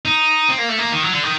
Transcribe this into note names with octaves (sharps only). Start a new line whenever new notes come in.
D#4
C4
A#3
A3
A#3
D#3
F#3
D3
D#3